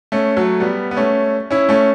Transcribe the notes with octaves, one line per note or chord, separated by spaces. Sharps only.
A3 C#4
F#3 A3
G3 B3
B3
A3 C#4
C#4 E4
A3 C#4